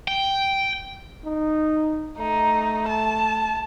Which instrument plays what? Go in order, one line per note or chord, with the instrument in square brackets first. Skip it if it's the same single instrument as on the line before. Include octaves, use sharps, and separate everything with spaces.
[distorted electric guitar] G5
[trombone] D#4
[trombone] A3 [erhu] D#4
[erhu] A5